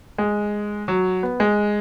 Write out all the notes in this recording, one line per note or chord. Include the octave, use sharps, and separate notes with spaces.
G#3
F#3
B3
G#3